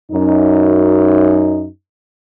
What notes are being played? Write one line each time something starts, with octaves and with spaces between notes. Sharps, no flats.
F#2 D#4